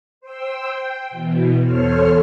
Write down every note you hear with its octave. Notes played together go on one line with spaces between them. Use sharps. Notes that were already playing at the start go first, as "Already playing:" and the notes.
C5 G5 E6
G5
B2 E3
E2 A4 C5 C#5 F6